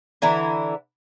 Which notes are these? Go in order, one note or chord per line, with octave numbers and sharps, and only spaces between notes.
D3 E3 E4 A#5